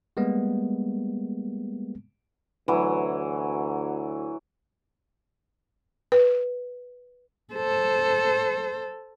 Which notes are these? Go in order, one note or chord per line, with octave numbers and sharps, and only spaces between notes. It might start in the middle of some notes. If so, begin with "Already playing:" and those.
G3 G#3 A#3 B3
D2 E3 F#3
B4
A4 C5